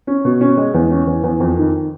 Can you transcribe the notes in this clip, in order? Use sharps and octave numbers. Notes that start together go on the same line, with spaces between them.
C#4
B2
C#4
G#3
E2
C#4
E2
E2
F2
D#3